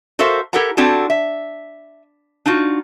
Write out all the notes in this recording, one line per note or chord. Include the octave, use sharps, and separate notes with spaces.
F#4 A4 A#4 C5 E5 F5
E4 G4 A4 A#4 F#5 A#5
C4 D4 E4 F#4 G4 A4
E5
D4 D#4 F4 F#4